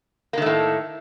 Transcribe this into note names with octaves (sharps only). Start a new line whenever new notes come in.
A2 D#3 A3 A#3